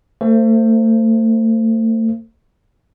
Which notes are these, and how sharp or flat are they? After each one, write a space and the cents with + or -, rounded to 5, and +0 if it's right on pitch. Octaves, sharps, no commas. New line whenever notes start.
A3 +35 C5 +0